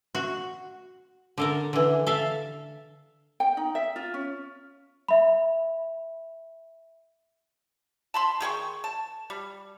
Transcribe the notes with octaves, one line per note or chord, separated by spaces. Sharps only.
F#4
D3 A4 A#4
D3 E3
A4 E5 F5
G5
D#4
E5
F4
C#4
E5 B5
A5 B5 C6
D#3 G#4 G5 C#6
A5
G3